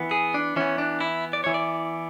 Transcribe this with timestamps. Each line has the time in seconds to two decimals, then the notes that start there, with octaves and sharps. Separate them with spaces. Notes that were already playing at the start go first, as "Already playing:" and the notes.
Already playing: E3 B3
0.11 G#4
0.34 D4
0.56 E3 B3 C#4
0.78 D4
1.01 E4
1.33 D5
1.44 E3 B3 C#5
1.54 D5